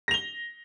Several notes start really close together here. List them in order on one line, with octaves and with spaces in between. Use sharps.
A#6 F7 G7